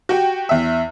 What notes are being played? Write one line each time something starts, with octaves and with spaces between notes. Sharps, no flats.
F#4 G4 G5
E2 E5